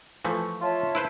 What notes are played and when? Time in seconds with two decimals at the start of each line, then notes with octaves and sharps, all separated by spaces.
0.25 E3 F3 A3 C#6
0.61 F4 C#5 E5 A5
0.95 E4 B4 C5